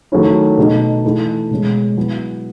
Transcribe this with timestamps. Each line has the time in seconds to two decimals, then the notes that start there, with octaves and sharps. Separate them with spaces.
0.12 D#3 F#3 A3 C#4 E4
0.58 B2 A3 D#4
1.04 E3 A3 E4
1.51 B2 G#3 C#4
1.97 F#3 B3 E4